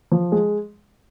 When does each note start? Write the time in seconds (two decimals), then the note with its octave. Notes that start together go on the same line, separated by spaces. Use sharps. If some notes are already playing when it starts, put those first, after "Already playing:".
0.12 F3
0.32 G#3